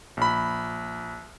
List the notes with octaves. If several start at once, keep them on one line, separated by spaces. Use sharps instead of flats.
A#1 B5